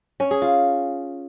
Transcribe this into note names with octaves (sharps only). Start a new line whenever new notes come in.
C#4
G#4
F4